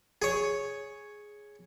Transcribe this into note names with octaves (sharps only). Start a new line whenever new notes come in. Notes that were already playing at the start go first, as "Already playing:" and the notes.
G#4 C#5